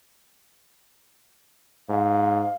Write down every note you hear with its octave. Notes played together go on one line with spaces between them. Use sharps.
G#2 F5